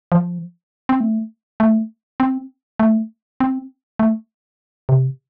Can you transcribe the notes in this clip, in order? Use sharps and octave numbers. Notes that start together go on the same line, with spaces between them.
F3
C4
A3
A3
C4
A3
C4
A3
C3